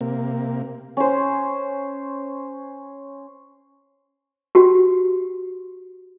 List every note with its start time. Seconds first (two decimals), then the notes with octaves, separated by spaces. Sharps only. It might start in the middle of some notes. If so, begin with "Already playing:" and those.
0.01 C3 A#3
0.97 C#4 C5
4.55 F#4 G4